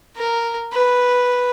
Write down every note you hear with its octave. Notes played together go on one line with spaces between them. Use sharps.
A#4
B4